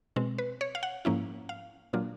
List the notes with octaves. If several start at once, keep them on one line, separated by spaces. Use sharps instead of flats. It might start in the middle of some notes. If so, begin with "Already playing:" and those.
B2 G#3 C4
B4
C#5
F5
F#5
G#2 F3 A#3 C#4 E4
F5
A#2 F#3 A#3 D4 F4